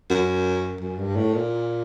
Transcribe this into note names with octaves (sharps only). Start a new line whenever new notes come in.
F#2
F#2
G2
A2
A#2